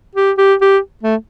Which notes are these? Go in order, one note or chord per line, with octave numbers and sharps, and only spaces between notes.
G4
G4
G4
A3